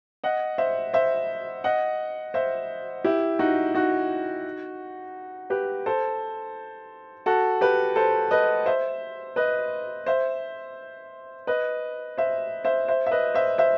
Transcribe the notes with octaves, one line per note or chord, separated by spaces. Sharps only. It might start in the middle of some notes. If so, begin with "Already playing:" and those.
D#5 F#5
C5 E5
C5 E5
D#5 F#5
C5 E5
E4 G4
D#4 F#4
D#4 F#4
G4 B4
A4 C5
F#4 A4
G4 B4
A4 C5
B4 D#5
C5 E5
B4 D#5
C5 E5
B4 D#5
C5 E5
C5 E5
C5 E5
E5
B4 D#5
C5 E5
C5 E5